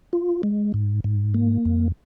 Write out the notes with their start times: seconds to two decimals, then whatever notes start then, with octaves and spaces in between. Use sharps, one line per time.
0.13 F4
0.43 G#3
0.74 G#2
1.04 G#2
1.34 A#3
1.65 F2